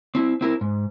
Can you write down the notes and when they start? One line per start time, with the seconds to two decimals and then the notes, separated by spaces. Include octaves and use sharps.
0.15 C4 E4
0.41 C4 E4 A#4
0.61 G#2